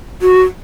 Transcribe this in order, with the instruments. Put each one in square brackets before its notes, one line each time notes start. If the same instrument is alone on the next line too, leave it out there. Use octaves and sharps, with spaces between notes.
[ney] F#4